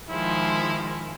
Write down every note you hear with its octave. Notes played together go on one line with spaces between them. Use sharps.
D#3 F3 G#3 E4